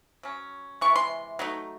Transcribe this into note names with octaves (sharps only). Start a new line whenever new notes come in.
F#3 C#4
C3 E3 G#3 C#6
C6
F#3 A3 D#4